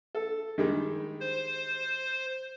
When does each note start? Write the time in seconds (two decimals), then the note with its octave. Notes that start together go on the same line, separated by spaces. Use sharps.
0.15 A4
0.58 D#3 G3 G#3
1.21 C5